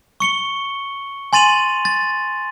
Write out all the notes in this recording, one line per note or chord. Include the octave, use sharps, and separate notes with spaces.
C#6 C#7 G7
G#5 C6 A6 D#7 F7 F#7
A6